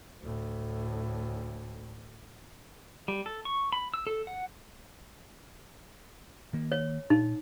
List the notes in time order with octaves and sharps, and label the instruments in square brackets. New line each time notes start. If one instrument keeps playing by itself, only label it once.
[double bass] D2 A2
[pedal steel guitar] G3
A4
C#6
B5
E6
A4
F#5
[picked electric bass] D#3 A#3
[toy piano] C#5
[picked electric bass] A#2 [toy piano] D#4